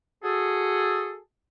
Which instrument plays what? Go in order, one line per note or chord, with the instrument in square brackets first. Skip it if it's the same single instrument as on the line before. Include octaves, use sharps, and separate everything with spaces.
[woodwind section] F#4 G#4 A4